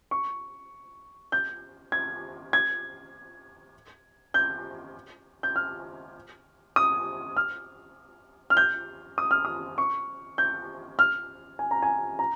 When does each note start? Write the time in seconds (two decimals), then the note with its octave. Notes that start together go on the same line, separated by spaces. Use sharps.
0.11 C#6
1.32 G6
1.92 G#6
2.53 G#6
4.34 G6
5.43 G6
5.56 F6
6.76 D#6
7.37 F6
8.50 F6
8.57 G6
9.18 D#6
9.31 F6
9.45 D#6
9.78 C#6
10.38 G6
10.99 F6
11.59 G#5
11.71 A#5
11.83 G#5
12.19 A#5